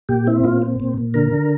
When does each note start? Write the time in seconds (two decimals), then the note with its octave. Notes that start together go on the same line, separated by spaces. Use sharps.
0.09 A#2 G4
0.27 C4 E4
0.44 A#2 F4
0.62 C4
0.80 A#2
0.98 A#2
1.14 D3 A#4
1.32 D3